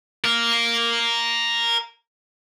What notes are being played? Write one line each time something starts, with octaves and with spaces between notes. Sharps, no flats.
A#4 F5